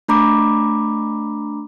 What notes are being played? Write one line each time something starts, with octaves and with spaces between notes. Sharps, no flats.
A3 D4 A#5 B5 D6